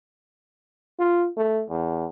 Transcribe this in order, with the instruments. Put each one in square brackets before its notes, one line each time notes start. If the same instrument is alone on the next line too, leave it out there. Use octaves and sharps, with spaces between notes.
[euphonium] F4
A3
E2